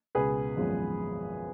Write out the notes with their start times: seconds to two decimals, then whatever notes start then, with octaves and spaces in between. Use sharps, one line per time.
0.15 C#2 B2 G#3 B3 G#4 B4
0.56 G#1 F#2 F3 G#3 B3